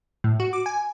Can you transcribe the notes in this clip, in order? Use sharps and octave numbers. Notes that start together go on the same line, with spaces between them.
A2
F#4
D6
G#5